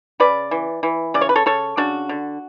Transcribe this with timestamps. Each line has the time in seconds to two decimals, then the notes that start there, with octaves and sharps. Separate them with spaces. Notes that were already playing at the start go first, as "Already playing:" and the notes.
0.20 C#3 B4 D5
0.51 E3
0.83 E3
1.14 C#3 D5
1.21 C#5
1.29 B4
1.36 A4 C#5
1.46 C#3 A4 C#5
1.77 C#3 D4 F#4
2.09 D3